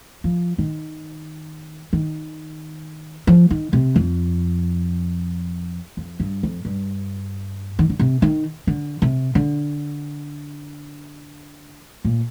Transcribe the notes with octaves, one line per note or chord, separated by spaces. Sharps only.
F3
D#3
D#3
F3
D#3
C3
F2
F2
G2
F2
G2
D#3
D3
C3
D#3
D3
C3
D3
A#2